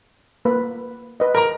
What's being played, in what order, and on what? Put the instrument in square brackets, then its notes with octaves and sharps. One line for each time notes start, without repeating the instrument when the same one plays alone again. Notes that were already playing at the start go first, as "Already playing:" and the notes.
[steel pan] A#3 B4 B5
B4 D#5
[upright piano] A#4 A#5